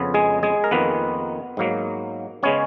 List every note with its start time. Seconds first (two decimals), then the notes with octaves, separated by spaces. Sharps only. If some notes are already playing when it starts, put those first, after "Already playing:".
Already playing: F2 C#3 B3
0.14 G#3 G#4
0.43 G#3 G#4
0.64 A#4
0.71 F2 D#3 A#3 B3 B4
1.57 G#2 F#3 A#3
2.43 C#3 G#3 B3 C#4 C#5